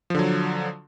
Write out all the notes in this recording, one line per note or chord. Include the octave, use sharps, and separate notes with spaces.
D3 F3 F#3